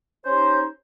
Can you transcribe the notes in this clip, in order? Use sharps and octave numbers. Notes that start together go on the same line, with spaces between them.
C#4 D#4 G4 C5